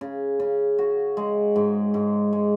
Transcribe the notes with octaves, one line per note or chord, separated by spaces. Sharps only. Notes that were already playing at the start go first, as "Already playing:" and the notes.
C#3
C#3
F#4
G#3
G#2
G#2
G#3